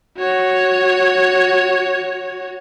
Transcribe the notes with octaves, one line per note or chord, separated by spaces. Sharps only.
F#4 C#5